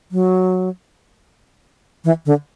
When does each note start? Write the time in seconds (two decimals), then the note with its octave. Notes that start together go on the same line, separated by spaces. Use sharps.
0.11 F#3
2.04 E3
2.26 D3